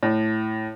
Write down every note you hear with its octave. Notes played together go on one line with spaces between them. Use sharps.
A2